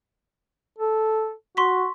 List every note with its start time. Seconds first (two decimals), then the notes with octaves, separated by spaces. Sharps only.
0.78 A4
1.57 F#4 C6 C#6 B6